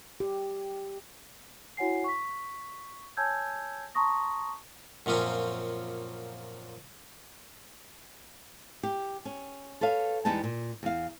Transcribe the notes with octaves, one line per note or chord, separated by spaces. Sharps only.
G4
E4 F#4 C#5 F#5 G#5 C7
C#6 B6
C#5 G#5 A5 E6 G6 G#6
A5 A#5 C6 C#6 D#6 A#6
F#2 A#2 F3 C4 C#4
G4
C#4
A4 B4 C#5 F5
E2 G3 G#3 B3 D#4 A5
A#2
E2 F5